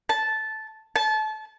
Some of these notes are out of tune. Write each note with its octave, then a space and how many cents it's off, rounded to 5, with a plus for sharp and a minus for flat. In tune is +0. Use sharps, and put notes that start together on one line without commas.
A5 -10
A5 -30